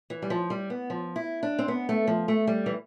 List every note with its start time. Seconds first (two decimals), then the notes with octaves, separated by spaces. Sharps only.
0.10 E3
0.22 G3
0.30 F3
0.50 G3
0.70 B3
0.90 F3
1.16 E4
1.43 D4
1.59 C4
1.68 B3
1.89 A3
2.07 F3
2.28 A3
2.47 G3
2.66 E3